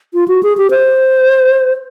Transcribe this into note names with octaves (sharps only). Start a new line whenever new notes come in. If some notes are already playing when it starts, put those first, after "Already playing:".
F4
F#4
G#4
G4
C5